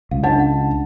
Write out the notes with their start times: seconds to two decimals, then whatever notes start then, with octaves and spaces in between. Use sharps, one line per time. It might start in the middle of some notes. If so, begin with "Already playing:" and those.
0.11 C#2 F5
0.24 D4 D#5 F#5 A5
0.40 F#5